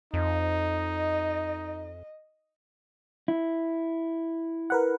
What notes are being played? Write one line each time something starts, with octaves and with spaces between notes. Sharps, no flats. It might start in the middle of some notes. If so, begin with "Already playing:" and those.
F2 D#4 D#5
E4
A#4 B4 F#5